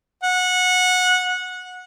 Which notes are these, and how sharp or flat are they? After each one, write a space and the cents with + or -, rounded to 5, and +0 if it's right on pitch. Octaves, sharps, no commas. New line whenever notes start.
F#5 -20